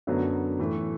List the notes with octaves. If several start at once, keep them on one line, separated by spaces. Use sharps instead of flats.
F#2 D3 F#3 B3 F#4
A2 E3 A3